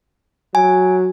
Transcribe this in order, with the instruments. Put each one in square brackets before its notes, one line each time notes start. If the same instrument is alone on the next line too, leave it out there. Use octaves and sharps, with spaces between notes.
[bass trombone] F#3 [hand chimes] G#5